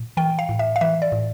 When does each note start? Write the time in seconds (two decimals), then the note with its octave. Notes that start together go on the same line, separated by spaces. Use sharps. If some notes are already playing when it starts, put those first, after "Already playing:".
Already playing: A#2
0.17 E3 G5
0.39 F5
0.49 A2
0.59 E5
0.76 F5
0.81 E3 E5
1.02 D5
1.12 A2